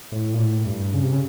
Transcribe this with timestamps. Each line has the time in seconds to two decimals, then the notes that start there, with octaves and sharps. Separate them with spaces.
0.12 A2
0.34 A#2
0.39 A2
0.66 G2
0.94 C#3
1.03 C3
1.12 C#3